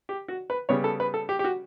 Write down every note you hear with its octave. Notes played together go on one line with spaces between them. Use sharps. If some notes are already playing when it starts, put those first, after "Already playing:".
G4
F#4
B4
C#3 G3 B3 C#5
A4
B4
A4
G4
G4
F#4